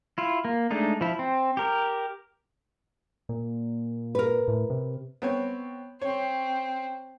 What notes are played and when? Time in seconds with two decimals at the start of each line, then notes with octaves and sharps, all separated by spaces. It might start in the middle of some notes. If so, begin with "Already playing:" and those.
0.18 E4 F4
0.45 A#3
0.71 G#3 A3 D4 D#4
1.01 F3 E4
1.19 C4
1.57 G4 A#4
3.29 A#2
4.15 A#4 B4
4.48 A2
4.70 C3
5.22 B3 C4 C#5
6.02 C4 C#5